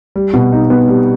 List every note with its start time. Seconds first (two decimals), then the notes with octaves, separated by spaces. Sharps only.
0.16 G3
0.34 B2
0.52 D#4
0.70 B3
0.88 G3